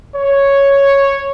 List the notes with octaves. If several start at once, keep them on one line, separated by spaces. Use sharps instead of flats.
C#5